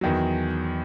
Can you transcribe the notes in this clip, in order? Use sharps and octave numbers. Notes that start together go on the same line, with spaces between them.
E2 D#3 F#3